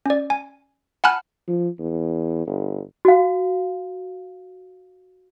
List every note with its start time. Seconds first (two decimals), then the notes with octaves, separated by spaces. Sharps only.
0.06 C#4 D5
0.30 G#5
1.04 F#5 G#5 A5 B5 F6 F#6
1.48 F3
1.79 E2
2.47 G1
3.05 F#4 F5